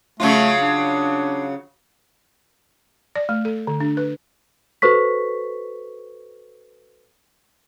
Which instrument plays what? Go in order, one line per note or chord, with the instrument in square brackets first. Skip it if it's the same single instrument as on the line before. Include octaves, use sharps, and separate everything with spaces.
[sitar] C#3 F#3 F4 [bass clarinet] A3
[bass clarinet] D4
[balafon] D5
A3
A4
D3
D4
B4
[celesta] F#4 A4 B4 C5 C#6 B6